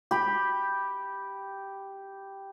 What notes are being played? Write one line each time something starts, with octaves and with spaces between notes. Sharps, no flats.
G4 B5